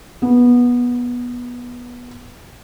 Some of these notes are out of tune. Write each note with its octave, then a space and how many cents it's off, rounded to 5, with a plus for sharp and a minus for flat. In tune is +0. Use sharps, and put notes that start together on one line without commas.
B3 -15